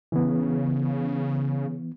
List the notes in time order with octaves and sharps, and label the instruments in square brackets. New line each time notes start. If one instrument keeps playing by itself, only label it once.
[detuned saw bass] C#3 [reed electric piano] E3 B3